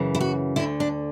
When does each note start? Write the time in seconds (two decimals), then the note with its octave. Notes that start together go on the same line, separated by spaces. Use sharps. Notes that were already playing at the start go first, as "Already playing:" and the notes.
Already playing: F#2 C#3 E3
0.15 E4
0.20 F#4
0.56 D2 D3 E4
0.80 D4